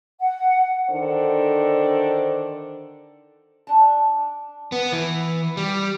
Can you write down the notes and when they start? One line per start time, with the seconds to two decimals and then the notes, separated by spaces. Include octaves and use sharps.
0.20 F#5
0.90 D3 D#3 D4 A4 C5
3.67 D4 A5
4.72 B3
4.93 E3
5.57 G3